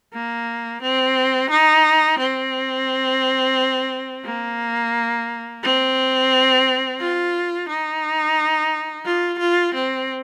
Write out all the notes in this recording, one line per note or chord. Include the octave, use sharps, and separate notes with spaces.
A#3
C4
D#4
C4
A#3
C4
F4
D#4
F4
F4
C4